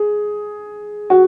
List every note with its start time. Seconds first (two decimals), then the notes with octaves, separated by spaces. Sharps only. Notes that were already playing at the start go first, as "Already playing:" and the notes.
Already playing: G#4
1.10 F#4